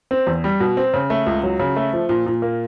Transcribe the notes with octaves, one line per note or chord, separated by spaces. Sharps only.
C4
E2
G3
B2
C4
C#3
A3
C#2
F#3
C#3
A3
F3
A#2
A#2
A#3